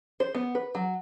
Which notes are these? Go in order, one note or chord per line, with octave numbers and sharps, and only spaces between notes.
C5
B3
B4
F#3